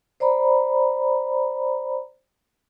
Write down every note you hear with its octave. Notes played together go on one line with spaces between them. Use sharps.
C5 D5 A#5 B5